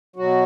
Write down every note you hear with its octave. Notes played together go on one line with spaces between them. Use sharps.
B2 F#3 F#4